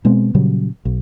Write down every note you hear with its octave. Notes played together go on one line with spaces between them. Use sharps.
B2 G#3 B3 C4
A#2 C#3 F#3 G3
B1